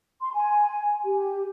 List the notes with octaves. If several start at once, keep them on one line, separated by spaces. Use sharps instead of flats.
C6
G#5
G4